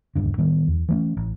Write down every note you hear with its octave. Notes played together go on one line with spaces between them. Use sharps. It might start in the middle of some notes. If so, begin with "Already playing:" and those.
D#1 C#2 G2 D3
A2 D#3 G3 B3
E2
E3 A3 C#4
A1